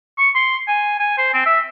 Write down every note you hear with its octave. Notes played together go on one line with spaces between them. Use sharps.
C#6
C6
G#5
G#5
C5
C4
E5